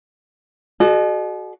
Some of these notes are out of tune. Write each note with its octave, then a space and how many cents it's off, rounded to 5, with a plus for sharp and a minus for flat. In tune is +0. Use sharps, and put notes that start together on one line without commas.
F#4 +10 A4 -45 D#5 -40